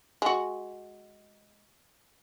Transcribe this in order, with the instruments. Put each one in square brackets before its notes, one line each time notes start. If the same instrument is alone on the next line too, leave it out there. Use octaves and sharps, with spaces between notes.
[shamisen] G#3 F#4